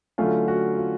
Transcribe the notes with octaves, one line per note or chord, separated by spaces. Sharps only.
D3 F#3 A3 C#4 F4
F#4
F4